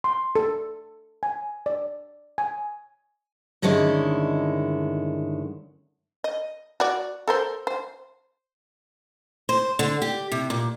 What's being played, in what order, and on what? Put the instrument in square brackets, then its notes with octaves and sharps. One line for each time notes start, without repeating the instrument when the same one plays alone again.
[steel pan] C6
A4
G#5
D5
G#5
[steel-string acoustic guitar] G2 D3 D#3 G#3 C#4 E4
[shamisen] D#5
F#4 D5
A4 A#4 C5
C5
[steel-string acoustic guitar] C5
D3
G4
C3
A#2